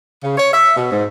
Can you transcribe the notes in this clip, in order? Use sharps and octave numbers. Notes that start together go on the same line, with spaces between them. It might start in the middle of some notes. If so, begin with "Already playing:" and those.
C#3
C#5
E5
B2
G#2